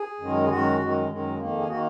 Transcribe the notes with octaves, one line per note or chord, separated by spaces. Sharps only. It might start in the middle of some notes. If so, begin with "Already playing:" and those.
Already playing: G#4
F#2 D#3 G#3
G#4
F#2 D#3 G#3 F#4
F#2 D#3 G#3
F#2 D#3 G#3
F2 D#3 A#3
G#4
D#3 A#3 F#4